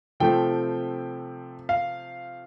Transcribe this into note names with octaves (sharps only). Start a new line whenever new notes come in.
C3 F3 A3 C4 G5
F5